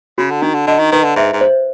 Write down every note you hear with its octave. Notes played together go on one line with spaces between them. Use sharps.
C#3 F#4
D3
D#3 D4
D3
D3 D#5
D#3
D#3 B4
D3
G#2 E5
G#2
C5